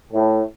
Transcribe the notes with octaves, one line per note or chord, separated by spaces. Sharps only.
A2